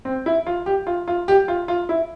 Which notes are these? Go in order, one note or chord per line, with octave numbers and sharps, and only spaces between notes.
C4
E4
F4
G4
F4
F4
G4
F4
F4
E4